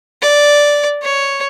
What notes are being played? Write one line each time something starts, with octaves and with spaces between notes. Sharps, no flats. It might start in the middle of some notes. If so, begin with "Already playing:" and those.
D5
C#5